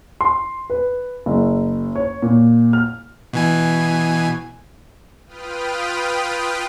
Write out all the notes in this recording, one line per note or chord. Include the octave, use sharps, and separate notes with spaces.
C6
B4
F#1
C#5
A#2
F6
B2 E3 G#5
F4 B4 G5 D#6 F6